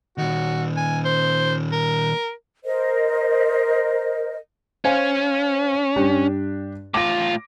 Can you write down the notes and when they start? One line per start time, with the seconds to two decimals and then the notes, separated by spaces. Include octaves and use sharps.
0.18 A#2 D#3 F#4
0.77 G#5
1.05 C5
1.72 A#4
2.65 A#4 C5 D#5
4.85 C#4 C5 F5 G#5
5.96 G2 D4 G4
6.94 A2 F4 D6 A#6